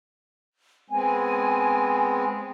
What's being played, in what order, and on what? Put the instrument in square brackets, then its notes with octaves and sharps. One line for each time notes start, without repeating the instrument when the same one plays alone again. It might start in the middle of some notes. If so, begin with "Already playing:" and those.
[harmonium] G#3 B3 C4 [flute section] G#5